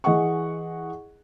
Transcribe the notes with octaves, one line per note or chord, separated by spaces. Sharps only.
E3 G#4 D#5 F#5 C#6